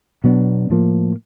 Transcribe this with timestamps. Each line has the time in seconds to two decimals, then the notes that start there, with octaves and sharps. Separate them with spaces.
0.24 B2 F#3 B3 D4
0.70 A2 F3 A#3